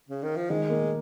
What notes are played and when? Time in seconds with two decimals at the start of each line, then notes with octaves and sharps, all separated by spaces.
0.09 C#3
0.23 D#3
0.36 F3
0.50 D#3 G#3
0.70 A#3